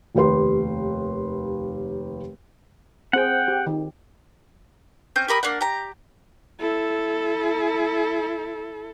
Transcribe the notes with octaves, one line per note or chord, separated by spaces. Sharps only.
F1 D#2 G4 B4 C6
C4 G#4 F#5 G5
G4
D#3
C4 C#4 G6
G4 A#4 B5 D#6
A#3 D4 F#5
G4 A#5
E4 A4